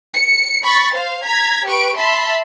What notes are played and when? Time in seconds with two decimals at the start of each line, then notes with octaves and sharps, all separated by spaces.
0.14 C#7
0.63 B5 C#6 A6
0.94 C5 F5
1.24 A#5 G#6 B6
1.65 G4 B4 C#6 D7
1.96 E5 A5 B5 C6